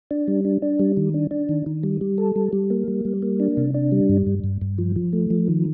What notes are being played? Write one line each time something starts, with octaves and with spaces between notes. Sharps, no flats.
D4
G3
D4
D4
G3
D#3
D4
D4
D#3
D#3
G3
G3
A4
G3
G3
A#3
G3
G3
A#3
D4
C3
D4
G3
G2
G2
G2
G2
F3
F3
A3
F3
D#3